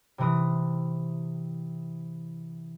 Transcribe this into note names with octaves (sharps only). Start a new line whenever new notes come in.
C3 E3 D#6